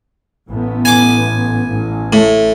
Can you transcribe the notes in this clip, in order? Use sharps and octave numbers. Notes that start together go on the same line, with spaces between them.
A1 A2 B3
G#5 D6
A1
A2